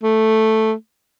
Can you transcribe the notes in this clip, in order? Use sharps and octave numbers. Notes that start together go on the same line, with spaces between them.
A3